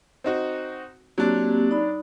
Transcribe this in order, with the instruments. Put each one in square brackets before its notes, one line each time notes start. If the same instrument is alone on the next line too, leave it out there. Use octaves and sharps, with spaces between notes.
[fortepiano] C4 D#4 F#4
[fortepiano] F#3 D4 [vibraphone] A#3 C4 G4
[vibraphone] D#4 D5 B5